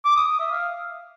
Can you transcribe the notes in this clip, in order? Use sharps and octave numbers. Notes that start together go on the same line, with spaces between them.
D6
D#6
D#6
E5
F5